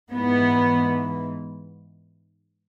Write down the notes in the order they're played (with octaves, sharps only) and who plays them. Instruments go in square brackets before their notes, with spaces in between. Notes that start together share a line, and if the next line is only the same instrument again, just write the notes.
[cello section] G#2 E3 B3